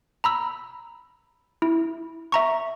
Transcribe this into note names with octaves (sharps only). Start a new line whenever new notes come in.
A#5 B5 E6
E4
E5 A#5 C#6